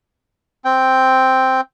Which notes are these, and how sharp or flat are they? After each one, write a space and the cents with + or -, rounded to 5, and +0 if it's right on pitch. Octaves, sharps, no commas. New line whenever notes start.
C4 +0 G5 +0